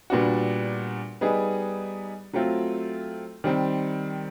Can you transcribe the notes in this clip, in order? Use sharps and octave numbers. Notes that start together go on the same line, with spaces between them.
A#2 G3 B3 D4 F#4
G3 B3 D#4 G#4
F#3 A3 C4 F4
D#3 G3 C4